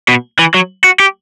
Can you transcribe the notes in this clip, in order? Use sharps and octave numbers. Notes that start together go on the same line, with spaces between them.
B2
E3
F#3
F#4
G4